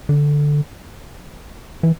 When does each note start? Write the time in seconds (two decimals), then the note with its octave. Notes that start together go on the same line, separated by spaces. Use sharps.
0.09 D3
1.83 E3